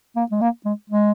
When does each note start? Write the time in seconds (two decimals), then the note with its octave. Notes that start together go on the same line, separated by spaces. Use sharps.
0.16 A#3
0.32 G#3
0.41 A#3
0.66 G#3
0.90 G#3